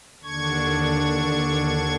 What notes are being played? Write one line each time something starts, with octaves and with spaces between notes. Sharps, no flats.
D#2 D3 D4 C#6 G#6